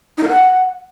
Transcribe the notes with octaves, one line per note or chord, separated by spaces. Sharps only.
D#4
A#4
F#5